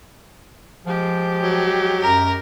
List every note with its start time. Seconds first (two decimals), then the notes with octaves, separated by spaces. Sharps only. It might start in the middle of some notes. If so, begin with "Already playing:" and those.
0.86 F3 G#3 G4
1.43 F#3
2.01 F#2 A#4 A#5